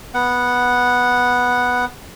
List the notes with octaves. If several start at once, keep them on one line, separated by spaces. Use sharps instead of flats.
B3 F#5